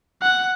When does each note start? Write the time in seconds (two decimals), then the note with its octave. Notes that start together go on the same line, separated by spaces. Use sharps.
0.22 F#5